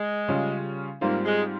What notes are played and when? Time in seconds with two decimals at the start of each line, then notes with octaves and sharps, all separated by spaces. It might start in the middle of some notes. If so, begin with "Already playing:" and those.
Already playing: G#3
0.28 C#3 G3 C#4 F4
1.01 G#2 G3 A#3 C4 F4
1.25 G#3